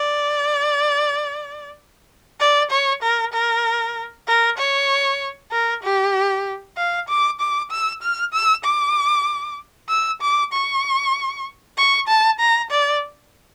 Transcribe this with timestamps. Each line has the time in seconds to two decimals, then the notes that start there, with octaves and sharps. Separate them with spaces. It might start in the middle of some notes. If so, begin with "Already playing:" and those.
Already playing: D5
2.40 D5
2.70 C#5
3.02 A#4
3.33 A#4
4.27 A#4
4.58 C#5
5.51 A#4
5.83 G4
6.77 F5
7.08 D6
7.40 D6
7.71 E6
8.02 F6
8.33 E6
8.64 D6
9.89 E6
10.21 D6
10.52 C#6
11.77 C#6
12.08 A5
12.39 A#5
12.70 D5